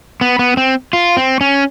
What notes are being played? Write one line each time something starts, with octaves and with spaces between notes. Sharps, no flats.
B3
B3
C4
F4
C4
C#4